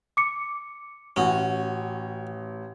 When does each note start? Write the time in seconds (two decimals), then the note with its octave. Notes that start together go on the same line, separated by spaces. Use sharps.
0.17 D6 C#7
1.16 A1 C#4 F#4